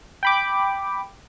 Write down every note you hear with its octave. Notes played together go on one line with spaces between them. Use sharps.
G5 B5 D6